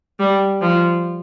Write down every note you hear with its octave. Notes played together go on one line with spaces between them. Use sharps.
G3
F3